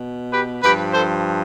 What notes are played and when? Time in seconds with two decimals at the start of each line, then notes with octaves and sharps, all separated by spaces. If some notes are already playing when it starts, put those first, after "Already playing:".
Already playing: B2
0.32 G4 B4
0.62 G2 F3 G4 B4
0.93 A4 C5